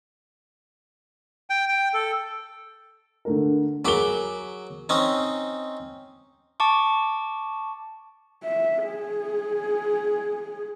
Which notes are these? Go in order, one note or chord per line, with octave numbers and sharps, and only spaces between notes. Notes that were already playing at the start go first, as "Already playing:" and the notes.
G5
G5
A4
D3 A3 A#4
F#3 G#4 A#4 B5 D6 G7
C4 C#4 D#4
A5 C#6 D6
E5
G#4